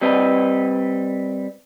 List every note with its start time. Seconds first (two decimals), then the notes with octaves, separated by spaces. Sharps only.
0.01 G3 C4 B4 D#5